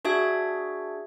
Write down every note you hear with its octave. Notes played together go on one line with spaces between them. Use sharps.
D4 F#4 G#4 E5 G#6